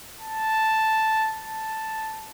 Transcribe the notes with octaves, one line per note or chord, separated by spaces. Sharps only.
A5
A5